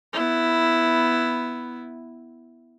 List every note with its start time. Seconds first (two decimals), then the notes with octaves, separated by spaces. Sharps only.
0.13 B3 E4